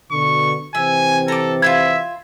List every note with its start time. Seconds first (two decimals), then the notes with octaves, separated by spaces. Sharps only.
0.11 B2 D3 C#6
0.75 C3 E3 C4 E5 G#5
1.28 A4 A#5 D6
1.62 F4 F#4 E5 B5 G#6